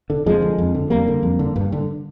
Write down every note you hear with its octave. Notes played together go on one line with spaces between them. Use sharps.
D3
F2 F3 G#3
D3
F2
D3
F2 G3 A#3
D3
F2
D3
G2
D3